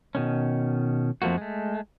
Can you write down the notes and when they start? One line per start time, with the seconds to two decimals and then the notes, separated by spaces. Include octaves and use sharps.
0.15 B2 D#3 C#4
1.22 F2 F3 A3 A#3 F#4
1.38 G#3 A3